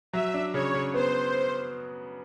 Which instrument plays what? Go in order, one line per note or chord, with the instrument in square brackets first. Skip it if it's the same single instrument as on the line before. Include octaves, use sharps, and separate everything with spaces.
[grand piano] F#3 [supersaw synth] E5
[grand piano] D4
[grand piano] C#3 [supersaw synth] C#5
[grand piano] C#3
[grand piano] B3 [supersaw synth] C5